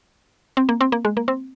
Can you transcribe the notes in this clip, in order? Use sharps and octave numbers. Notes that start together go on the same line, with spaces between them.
C4
A#3
C4
A#3
G#3
A#3
C4